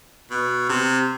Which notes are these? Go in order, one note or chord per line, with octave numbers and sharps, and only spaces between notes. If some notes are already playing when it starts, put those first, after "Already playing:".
B2
C3